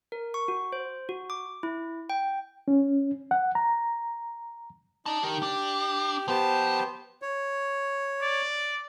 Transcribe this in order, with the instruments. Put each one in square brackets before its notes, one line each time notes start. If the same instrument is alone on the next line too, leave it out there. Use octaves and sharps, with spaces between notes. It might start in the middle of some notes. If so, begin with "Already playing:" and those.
[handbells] A#4
C#6
F#4
C5
F#4
D6
E4
G5
[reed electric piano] C#4
F#5
A#5
[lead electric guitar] D4 A5 [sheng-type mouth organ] D#4 A#5
[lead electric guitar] D#4 A#4 [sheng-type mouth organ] G4
[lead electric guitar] D4
[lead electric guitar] F3 A5 [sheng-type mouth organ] B3 G4 C5
[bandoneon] C#5
[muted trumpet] D5